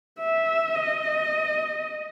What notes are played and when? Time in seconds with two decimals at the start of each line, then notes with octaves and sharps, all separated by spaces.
0.19 E5
0.75 D#5